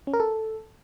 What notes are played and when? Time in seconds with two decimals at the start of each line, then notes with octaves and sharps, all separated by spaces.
0.07 C#4
0.13 A#4
0.20 A4